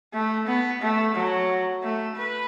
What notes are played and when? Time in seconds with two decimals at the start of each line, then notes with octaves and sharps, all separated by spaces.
0.14 A3
0.47 B3
0.82 A3
1.15 F#3
1.83 A3
2.16 B4